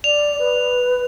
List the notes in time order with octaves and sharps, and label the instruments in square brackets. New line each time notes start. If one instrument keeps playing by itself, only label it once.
[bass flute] D5 [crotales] F7
[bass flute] B4